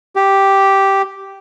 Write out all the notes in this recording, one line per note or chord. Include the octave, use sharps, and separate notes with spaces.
G4